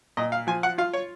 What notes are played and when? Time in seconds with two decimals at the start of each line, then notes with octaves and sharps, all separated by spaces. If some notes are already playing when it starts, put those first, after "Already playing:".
0.17 A#2 D#5
0.32 F5
0.47 F3 G#5
0.63 F#5
0.78 F4 F5
0.93 C#5